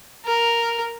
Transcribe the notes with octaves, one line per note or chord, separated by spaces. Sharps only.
A#4